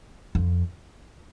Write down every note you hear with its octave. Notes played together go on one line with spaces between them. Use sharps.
F2